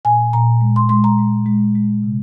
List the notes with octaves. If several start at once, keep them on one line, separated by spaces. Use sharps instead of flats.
A#2 G#5
A#2 A#5
G#3
C6
G#3 C6
A#5
G#3
G#3
G#3
C3